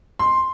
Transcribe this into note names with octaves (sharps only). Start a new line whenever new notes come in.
C6